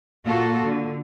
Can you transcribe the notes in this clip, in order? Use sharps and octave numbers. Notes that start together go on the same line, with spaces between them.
A#2 A#3 F4 F#4 A4
D3